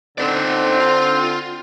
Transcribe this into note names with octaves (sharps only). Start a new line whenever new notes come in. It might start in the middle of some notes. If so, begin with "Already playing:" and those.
D3 C4 D#4 D5
F4